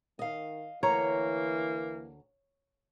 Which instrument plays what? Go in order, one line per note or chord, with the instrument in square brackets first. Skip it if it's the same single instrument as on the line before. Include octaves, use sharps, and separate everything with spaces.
[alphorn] D#3 [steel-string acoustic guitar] D#5 F5
[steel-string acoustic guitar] D2 A#5 [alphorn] E3 [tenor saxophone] A#3 [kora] C#5